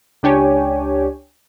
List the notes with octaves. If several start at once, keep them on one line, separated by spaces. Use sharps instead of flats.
C#2 D4 G4 C#5 G#5